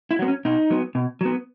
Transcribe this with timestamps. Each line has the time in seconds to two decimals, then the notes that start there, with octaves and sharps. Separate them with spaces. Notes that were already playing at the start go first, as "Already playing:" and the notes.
0.11 E4
0.19 F#3 B3
0.28 C#4
0.45 B2 D#4
0.70 F#3 B3
0.95 B2
1.21 F#3 B3